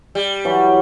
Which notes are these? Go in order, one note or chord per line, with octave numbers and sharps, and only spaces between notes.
G3
E3 F#3